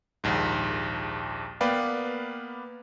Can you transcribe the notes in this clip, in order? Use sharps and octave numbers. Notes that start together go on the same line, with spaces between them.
A#1 D#2 G#2
A#3 B3 B4 D5 F5 G5